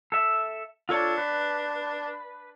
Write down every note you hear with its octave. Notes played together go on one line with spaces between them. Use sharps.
A4 E5
D4 F4 A4 C#5
B4